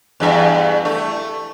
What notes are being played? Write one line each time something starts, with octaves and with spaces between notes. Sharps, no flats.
E2 G2 E5
A3